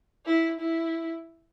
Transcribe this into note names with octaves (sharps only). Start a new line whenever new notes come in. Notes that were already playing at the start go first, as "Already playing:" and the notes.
E4
E4